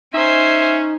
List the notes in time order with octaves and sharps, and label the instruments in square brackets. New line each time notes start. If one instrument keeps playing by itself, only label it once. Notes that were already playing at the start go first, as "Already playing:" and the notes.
[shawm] C#4 [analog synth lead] D#4 [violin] C5 G#5 [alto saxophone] E5